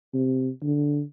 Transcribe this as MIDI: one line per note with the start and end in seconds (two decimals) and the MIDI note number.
0.14 0.49 48
0.63 1.02 50